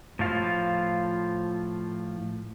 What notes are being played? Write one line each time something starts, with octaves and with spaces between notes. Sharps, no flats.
A2 F3 F4